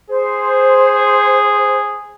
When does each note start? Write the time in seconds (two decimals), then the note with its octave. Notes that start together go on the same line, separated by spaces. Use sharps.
0.10 G#4 C5